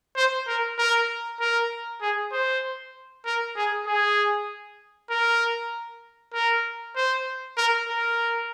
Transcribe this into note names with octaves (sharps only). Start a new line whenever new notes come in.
C5
A#4
A#4
A#4
G#4
C5
A#4
G#4
G#4
A#4
A#4
C5
A#4
A#4